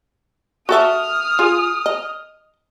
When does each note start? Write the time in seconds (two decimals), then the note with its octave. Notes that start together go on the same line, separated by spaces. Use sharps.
0.69 F#4 A4 E5 D#6 F6
1.39 F4 G#4
1.86 D#5